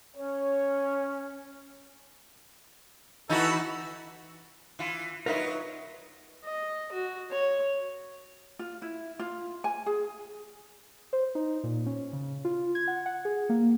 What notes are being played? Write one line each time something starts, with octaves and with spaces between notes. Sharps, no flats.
C#4 C#5
E3 D#4 F#4 A4 B5 E6
E3 F4
F#3 D#4 F4 A#4 B4 E5
D#5
F#4
C#5
F4
E4
F4
G#5
G#4
C5
D#4
A#2
C#4
C#3
F4
G#6
F#5
F#5
G#4
A#3